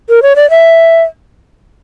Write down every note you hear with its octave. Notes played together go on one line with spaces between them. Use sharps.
A#4
C#5
D5
E5